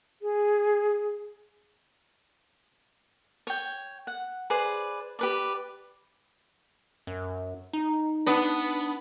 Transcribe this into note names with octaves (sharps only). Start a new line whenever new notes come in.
G#4
C#5 G5
F#5
G#4 B4 C5 D5
G4 B4 D5
F#2
D#4
B3 D4